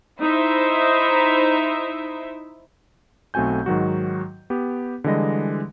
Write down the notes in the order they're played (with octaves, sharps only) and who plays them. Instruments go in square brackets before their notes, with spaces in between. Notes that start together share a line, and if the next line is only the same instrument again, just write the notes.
[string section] D#4 E4 C5 E5
[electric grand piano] B1 A3 C4 F#4 G#5 G6
G#2 D#3 F#3 F#4
B3 G4
D3 E3 G3 G#3 D#5 A#6